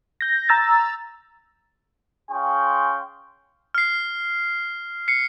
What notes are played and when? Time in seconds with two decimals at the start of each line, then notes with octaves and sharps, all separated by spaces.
0.21 G6 A#6
0.49 A#5 E6 A6
2.31 C#4 F4 G#4 G5 C6 C#6
3.75 F6 C7
5.08 C7 C#7